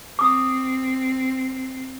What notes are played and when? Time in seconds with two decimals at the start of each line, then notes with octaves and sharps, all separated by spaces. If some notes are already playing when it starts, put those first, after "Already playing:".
0.19 C4 D6 D#6